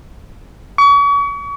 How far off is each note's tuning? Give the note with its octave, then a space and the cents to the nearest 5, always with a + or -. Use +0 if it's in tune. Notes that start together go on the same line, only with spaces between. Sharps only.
C#6 +40